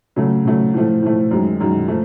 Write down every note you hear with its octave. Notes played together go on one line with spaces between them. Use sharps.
C#3 F#3 A3
C#3 F#3 A3
A2 F3 A3
A2 F3 A3
F#2 D#3 G#3
F#2 D#3 G#3
F3 A3